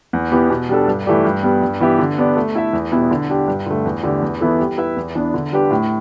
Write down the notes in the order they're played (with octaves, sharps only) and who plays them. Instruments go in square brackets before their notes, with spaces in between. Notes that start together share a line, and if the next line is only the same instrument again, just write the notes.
[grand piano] E2
E3 B3 G4
B2
G3 D4 A4
G2
E3 A3 G4 D5
G2
G3 B3
G2
E3 B3 G4 E5
D3
B3 D4 G4 D5
A3
E4 A4 E5
E2
B2 G3 B3 E4
D3
G3 D4 G4
G2
D3 A3
E2
D3 A3 G4 D5
E2
E3 B3 E4 A4
G3
E4 B4 E5
E2
E3 B3 D4
D3
G3 D4 G4 B4
A2